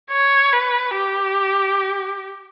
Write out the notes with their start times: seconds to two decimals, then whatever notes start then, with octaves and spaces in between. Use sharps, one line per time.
0.11 C#5
0.53 B4
0.96 G4